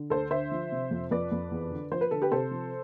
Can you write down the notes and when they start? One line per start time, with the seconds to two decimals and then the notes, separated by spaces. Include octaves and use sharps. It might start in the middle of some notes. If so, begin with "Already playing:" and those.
Already playing: D3
0.10 D2 A4 C5
0.30 D3 C5 E5
0.52 F3
0.72 C3
0.91 F2
1.11 F2 B4 D5
1.32 F2
1.51 E2
1.71 D3
1.91 F3 C5
2.01 B4
2.11 D3 A4
2.22 G4 B4
2.31 C3 A4 C5
2.51 F3